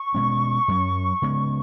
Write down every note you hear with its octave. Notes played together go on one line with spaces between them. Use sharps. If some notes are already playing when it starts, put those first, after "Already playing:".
Already playing: C#6
B2 G#3 C#4
F#2 F#3 C#4
C#3 G#3 B3